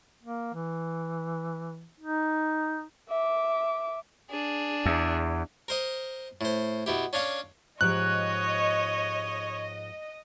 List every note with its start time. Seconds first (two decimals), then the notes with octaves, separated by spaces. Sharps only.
0.23 A#3
0.54 E3
2.00 D#4
3.09 E5 D6
4.30 D4 G#4
4.86 E2
5.68 A#4 C5 D#5
6.41 A2 C5
6.86 B2 E4 G4
7.13 C#4 D4 C#5 F5
7.81 G#2 F3 G4 C#5 D#5 F#6